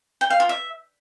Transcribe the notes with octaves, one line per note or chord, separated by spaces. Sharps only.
G5
F5
F4
E5